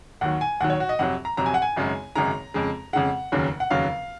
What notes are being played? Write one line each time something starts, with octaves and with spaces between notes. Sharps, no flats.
D#2 D#3 F#3 F#5
G#5
D#2 D#3 F#3 F#5
C#5
F#4
D#5
F2 C3 F#3 F#5
A#5
F2 C3 F#3 A#5
G#5
F#5
G#5
G#1 F#2 C#3 G#3
G#1 F#2 C#3 G#3 A#5
F2 C#3 G#3
F2 C#3 G#3 F#5
F1 D#2 C#3 F#3
F#5
F1 D#2 C#3 F#3 F5